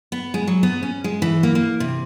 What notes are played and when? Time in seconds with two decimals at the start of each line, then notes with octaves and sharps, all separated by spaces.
0.12 B3
0.34 G#3
0.47 F#3
0.63 B3
0.83 C#4
1.04 G#3
1.22 E3
1.43 A#3
1.55 A#3
1.80 C3